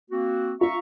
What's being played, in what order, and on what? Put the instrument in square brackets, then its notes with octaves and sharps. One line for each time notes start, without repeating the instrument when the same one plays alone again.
[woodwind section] A#3 C4 F#4
[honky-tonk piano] F4 [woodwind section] E5 A#5 C#6